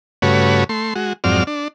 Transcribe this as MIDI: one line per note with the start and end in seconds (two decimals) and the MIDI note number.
0.22 0.64 43
0.22 0.64 49
0.22 0.64 57
0.22 0.64 66
0.22 0.64 71
0.22 0.64 73
0.69 0.94 57
0.69 0.94 84
0.96 1.13 56
0.96 1.13 66
1.24 1.44 41
1.24 1.44 44
1.24 1.44 54
1.24 1.44 60
1.24 1.44 74
1.24 1.44 89
1.47 1.68 62